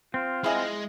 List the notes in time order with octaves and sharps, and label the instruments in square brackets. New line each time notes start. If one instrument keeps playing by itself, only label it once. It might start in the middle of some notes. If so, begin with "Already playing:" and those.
[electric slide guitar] C4 [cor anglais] F4
[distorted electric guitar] G#3 [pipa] E4 G#4 D#5